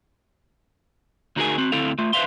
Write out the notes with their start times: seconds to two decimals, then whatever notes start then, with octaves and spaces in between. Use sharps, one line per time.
1.36 D2 D#4 F#4 G#4 A#4 G#5
1.58 C4 F#4
1.72 D2 C4 E4 A4 F5
1.99 A3 F4
2.13 B4 C5 D5 E5 F5 C6